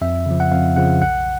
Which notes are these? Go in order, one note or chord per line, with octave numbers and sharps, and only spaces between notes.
F2 E5
C#3 F3
F#5
F2 F5
C#3 F3 F#5
B1 F#5